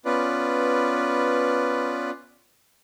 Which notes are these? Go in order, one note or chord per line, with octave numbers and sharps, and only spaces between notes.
B3 C#4 F4 B4 D5